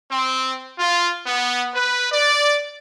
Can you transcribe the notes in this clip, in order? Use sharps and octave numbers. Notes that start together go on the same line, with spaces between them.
C4
F4
B3
B4
D5